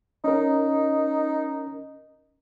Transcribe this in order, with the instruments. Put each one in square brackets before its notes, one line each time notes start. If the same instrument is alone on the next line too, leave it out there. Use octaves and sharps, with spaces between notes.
[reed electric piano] C#4 A#4 [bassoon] D#4